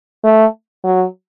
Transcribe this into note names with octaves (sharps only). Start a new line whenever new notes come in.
A3
F#3